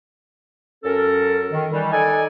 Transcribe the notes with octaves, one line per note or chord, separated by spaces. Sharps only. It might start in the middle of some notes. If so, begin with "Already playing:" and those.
F#2 C#4 A4 A#4
D#3
D#3 E3 G3
D#4 A4 D5 G#5